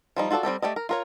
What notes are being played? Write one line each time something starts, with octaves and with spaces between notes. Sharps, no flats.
F3 G3 D#4
F4 F#4 A4 C5 D5
G3 C4 G4 A4
A3 G4 D5 D#5
A#4
F4 A#4 C#5